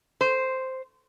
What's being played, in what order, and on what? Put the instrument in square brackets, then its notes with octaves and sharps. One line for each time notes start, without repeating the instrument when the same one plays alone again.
[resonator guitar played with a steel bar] C5